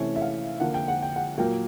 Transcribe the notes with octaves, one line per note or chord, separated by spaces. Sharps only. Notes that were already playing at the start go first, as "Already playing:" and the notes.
Already playing: C3 E3 A3 C#4 C#5
E5
F5
D3 F3 A#3 F#5
G5
F#5
G5
F#5
A#2 F#3 A#3 G5